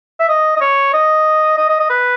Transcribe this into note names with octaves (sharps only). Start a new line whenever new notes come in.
E5
D#5
D#5
C#5
D#5
D#5
D#5
D#5
B4